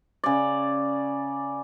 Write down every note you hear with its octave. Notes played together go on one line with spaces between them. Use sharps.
C#3 D5